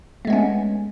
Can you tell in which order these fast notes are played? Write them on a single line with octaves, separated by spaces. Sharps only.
A3 G#3 B3 C#4